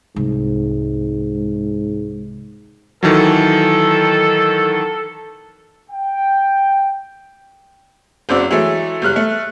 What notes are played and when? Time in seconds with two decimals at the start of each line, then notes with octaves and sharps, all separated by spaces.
0.16 C2 G#2
3.03 D#3 E3 F#3 A4
5.90 G5
8.29 F#1 C#3 C4 F#4 D5 E6
8.51 E3 F#3 G#3 A3
9.02 F#1 G3 F6 F#6
9.16 A3